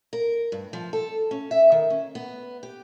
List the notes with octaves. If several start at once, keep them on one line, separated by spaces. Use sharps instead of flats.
A#4
G2
F3
A4
C#4
E5
D#3
C#4
B3
G4